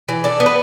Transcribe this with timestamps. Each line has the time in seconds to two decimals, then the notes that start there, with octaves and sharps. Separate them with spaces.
0.09 E3
0.24 D4 A4
0.40 B3
0.46 B4